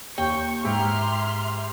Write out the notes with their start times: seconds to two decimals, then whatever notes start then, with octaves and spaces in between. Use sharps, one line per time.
0.18 D#2 G5 C#6
0.65 G#2 E4 G4 E5 A#5 C6 F6